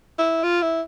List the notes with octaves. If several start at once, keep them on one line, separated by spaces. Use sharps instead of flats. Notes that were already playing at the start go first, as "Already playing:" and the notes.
E4
F4
E4